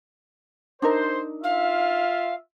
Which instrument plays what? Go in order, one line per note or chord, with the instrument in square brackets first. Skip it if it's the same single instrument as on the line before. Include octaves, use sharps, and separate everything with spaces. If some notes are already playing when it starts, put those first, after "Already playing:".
[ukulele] D4 D#4 A#4 [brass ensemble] C5
[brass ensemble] F4 E5 [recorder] F5